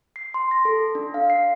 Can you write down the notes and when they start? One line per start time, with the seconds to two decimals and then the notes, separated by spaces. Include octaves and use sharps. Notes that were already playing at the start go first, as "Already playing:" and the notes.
0.16 C7
0.34 C6
0.51 A#6
0.65 A4
0.95 D4
1.14 F5
1.30 C7